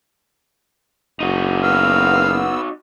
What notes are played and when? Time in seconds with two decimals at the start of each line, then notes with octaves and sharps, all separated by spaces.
1.20 F#1 D#4 F#4
1.63 B3 F5 E6